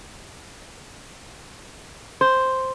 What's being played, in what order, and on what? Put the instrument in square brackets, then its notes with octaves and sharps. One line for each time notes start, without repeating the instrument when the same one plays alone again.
[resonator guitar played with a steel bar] C5